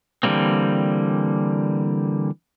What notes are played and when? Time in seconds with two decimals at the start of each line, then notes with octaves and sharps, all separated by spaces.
0.23 D3 E3 G3 A#3 C4